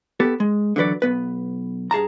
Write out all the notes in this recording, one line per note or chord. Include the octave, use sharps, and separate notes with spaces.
B3 G4 A4
G#3
D3 E3 F#3 B4 D5
B1 B3 B4
G2 G#4 A5 A#5